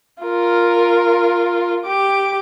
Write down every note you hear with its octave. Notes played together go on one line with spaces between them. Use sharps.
F4 A#4
G4 D6